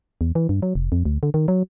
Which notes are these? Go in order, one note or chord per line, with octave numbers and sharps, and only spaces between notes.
E2
E3
G2
F#3
F1
F2
D2
D3
D#3
F#3